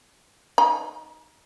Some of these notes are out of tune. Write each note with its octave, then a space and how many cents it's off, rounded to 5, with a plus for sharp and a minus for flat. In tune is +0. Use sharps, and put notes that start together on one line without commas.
D#4 +0 A#5 +40